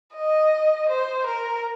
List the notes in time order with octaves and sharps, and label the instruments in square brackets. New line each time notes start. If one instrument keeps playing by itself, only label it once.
[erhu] D#5
C5
A#4